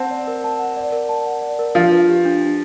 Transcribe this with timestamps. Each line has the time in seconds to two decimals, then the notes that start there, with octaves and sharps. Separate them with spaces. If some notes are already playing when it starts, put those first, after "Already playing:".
Already playing: C4 F#5 A5
0.11 D5
0.27 A#4
0.44 A5
0.59 F#5
0.76 D5
0.92 A#4
1.09 A5
1.27 F#5
1.42 D5
1.59 A#4
1.75 F3 D4
1.92 B4
2.09 G4
2.25 D4
2.42 D4